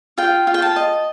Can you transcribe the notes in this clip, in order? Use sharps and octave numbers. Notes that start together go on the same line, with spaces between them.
F4 G5
F4
G5
A5
D#5